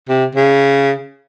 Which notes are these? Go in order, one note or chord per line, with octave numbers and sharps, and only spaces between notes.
C3
C#3